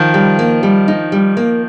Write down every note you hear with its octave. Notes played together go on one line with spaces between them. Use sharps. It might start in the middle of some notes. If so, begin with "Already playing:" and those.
Already playing: D#3 F3
G3
A#3
G3
D#4
G3
A#3